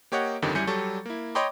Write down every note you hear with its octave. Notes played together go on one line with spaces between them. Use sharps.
A#3 G4 C#5 D#5 F#5
G1 F2 D3 D#3 G4
F#2 G3 E4 G#5 G6 C#7
F#3 G3 A4 C#6 A6
A#3 E4
C#5 D#5 G5 B5 C6 D6